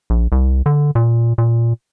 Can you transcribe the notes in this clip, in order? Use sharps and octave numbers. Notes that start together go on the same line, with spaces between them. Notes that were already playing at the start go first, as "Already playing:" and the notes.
A#1
C2
D3
A#2
A#2